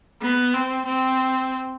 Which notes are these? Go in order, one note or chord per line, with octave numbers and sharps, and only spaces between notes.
B3
C4
C4